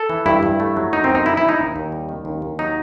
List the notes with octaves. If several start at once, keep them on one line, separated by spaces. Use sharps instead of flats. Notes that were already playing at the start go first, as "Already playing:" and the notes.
Already playing: A4
E3
G2 E4
G2
A3
F#3
F#2 D#4
C4
F#2
D#4
G3 E4
E4
E3
D#4
D#2
D#2
G3
D#3
D#2
D#2
F#3 D#4